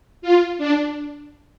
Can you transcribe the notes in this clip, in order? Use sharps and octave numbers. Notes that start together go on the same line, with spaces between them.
F4
D4